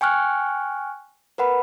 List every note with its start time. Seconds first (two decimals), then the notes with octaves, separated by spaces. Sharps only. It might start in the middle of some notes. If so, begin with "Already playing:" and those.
0.01 G5 G#5 C#6 F6 F#6
1.38 A#4 B4 F#5 B5